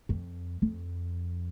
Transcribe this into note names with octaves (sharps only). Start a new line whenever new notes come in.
F2
F2